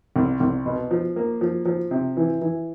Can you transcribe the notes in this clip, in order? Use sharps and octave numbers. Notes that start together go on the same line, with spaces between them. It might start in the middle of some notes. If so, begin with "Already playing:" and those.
C2
C2
B2
F3
A#3
F3
F3
C3
E3
E3